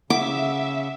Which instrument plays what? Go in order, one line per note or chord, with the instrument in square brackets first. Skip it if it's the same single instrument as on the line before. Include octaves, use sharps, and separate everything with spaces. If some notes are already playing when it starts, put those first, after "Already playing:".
[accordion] C#3 [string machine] E5 [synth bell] F#5 [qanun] D6